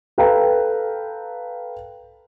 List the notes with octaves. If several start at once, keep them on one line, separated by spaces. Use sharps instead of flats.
A4 B4 F5 G5 A#5